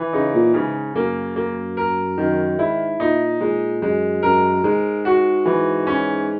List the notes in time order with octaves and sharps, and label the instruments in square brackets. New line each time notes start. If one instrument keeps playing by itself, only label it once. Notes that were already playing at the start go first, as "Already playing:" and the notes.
Already playing: [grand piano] E3
[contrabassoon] C#3 [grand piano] D#4
[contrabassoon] A#2
[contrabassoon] G#2 [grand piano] C#3
[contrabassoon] F#2 [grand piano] A#3
[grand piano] A#3
A#4
[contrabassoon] F#2 [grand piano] D#3
[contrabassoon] G#2 [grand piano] E4
[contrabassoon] A#2 [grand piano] D#4
[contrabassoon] A#2 [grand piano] G#3
[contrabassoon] F#2 [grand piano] G#3
[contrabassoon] F#2 [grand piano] A#4
[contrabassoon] G#2 [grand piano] G#3
[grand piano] F#4
E3
C#4